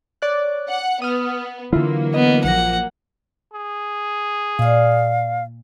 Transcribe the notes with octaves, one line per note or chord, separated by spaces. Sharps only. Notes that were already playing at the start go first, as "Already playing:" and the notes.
C#5 D5 F#6
F#5
B3 D#6 F6
D3 E3 F#3 A#3 E4 F4
B3 D#5
A#1 F3 F#5 A#6
G#4
A#2 D5 D#5 F5